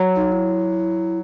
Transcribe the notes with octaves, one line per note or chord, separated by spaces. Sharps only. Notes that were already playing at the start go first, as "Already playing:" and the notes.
Already playing: F#3
D#4
E4